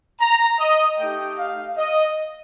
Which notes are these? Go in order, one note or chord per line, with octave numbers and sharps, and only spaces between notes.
A#5
D#5
A3 D#4 G4 G5
F5
D#5